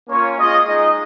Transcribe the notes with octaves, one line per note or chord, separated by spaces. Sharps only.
A#3 C#4 F4 C#5
G#3 F4 D#5
G#3 D#4 D#5